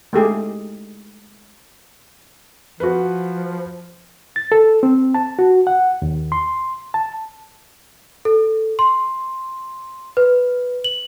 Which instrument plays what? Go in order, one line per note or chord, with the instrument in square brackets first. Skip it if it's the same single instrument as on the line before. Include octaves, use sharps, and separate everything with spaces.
[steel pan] G#3 A3 G4 G#4
[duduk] F3 [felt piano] F#4 B4
[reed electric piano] A6
A4
C4
A5
F#4
F#5
D#2
C6
A5
[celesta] A4
C6
B4
F#7